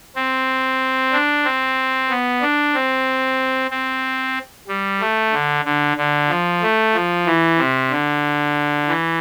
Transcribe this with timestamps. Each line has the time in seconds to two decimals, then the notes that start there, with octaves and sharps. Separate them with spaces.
0.16 C4
1.13 D4
1.45 C4
2.09 B3
2.42 D4
2.74 C4
3.71 C4
4.68 G3
5.00 A3
5.32 D3
5.64 D3
5.97 D3
6.29 F3
6.62 A3
6.94 F3
7.26 E3
7.58 C3
7.91 D3
8.88 E3